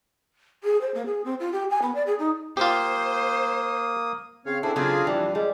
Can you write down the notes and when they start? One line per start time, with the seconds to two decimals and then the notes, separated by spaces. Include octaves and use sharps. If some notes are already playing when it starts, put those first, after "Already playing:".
0.64 G#4
0.81 C5
0.94 A#3
1.06 G#4
1.25 C4
1.40 F4
1.52 G4
1.70 G#5
1.82 B3
1.95 D5
2.06 G#4
2.19 D#4
2.57 A#3 F4 G4 C5 D#6
4.46 C#3 C4 C#5 F5
4.63 C4 D4 E4 G#4 A4
4.76 C#3 F#3 C4 F4 G#4
5.07 F2 E3 G3
5.35 G3 G#3